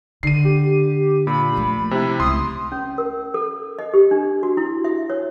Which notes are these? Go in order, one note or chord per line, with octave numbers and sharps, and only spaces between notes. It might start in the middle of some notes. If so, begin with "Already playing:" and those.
D3 C7 D#7
G4
A#2 B5
F3 A3
C3 E4
C#2 A3 C6 D#6
C#4
A#4
A4
D#5
G4
D4
F#4
E4
E5
C#5